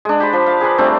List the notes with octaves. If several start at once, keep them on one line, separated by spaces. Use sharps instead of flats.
G#3 D4
G4 C5 B5
F3
F5
G#4 A#4 B4
G3 A3 C4 D4